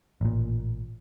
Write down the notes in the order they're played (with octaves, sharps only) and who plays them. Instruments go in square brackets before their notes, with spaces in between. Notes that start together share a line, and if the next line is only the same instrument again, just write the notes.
[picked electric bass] A1 A#2